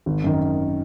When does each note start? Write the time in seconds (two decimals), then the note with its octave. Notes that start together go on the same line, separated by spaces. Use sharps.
0.06 G#1
0.24 F#2 D#3